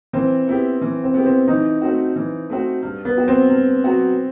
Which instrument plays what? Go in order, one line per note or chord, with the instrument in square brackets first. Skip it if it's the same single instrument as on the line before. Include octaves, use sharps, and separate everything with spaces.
[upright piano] E3 [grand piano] C4
[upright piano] B3 E4 G4
E3
[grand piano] C4
[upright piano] B3 E4 G4
[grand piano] C4
[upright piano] E3 [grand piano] D#4
[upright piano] A3 C4 F#4
E3
A3 C4 F#4
G2
[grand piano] B3
[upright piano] F#3 B3 F#4
[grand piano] C4
[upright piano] G2
F#3 B3 F#4